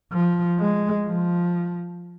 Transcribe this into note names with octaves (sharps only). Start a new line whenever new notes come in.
F3
G#3
F3